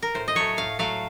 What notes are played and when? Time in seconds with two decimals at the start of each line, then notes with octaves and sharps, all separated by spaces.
0.02 A#4
0.14 A2 C5
0.28 D#5
0.35 F#3 A3 C#5
0.57 A2 F5
0.79 F#3 A3 F5